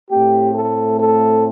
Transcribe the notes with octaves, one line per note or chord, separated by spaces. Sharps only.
A2 A3 C4 G4
A4
A4